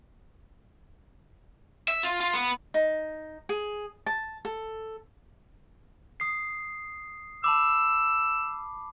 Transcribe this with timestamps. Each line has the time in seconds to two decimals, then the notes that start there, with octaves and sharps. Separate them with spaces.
1.88 E5
2.03 F4
2.20 F4
2.34 B3
2.74 D#4
3.49 G#4
4.06 A5
4.45 A4
6.20 D#6 C7
7.44 A5 B5 D6 E6